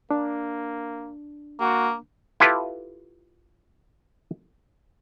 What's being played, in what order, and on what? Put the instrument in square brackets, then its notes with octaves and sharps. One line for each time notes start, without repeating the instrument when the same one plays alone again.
[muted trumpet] A#3 [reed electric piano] D4
[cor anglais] A#3 [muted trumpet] F#4
[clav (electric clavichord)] E4 F4 G4 A4 B4